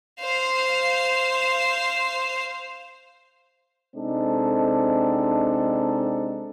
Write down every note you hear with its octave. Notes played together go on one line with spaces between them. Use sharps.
C5 F5
C3 G#3 C4 D4 D#4 A4